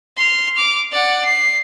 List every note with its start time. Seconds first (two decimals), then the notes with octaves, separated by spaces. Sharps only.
0.17 C6 F6
0.55 D6 F6
0.92 D5 F#5
1.24 C7